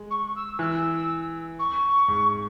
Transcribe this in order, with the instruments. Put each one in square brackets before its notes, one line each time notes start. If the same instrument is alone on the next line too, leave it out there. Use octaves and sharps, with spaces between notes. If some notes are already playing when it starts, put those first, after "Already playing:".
Already playing: [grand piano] G#3
[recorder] C#6
E6
[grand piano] E3 [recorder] E6 F#6
[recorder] C#6
[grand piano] G#2